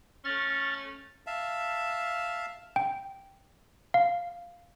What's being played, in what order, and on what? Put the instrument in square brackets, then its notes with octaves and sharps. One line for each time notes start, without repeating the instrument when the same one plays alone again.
[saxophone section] A3 C#4 [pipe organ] F6 A6
[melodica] E5 F5 A5
[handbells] G5
F5